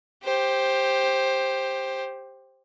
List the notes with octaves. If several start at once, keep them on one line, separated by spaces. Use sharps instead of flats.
G4 C5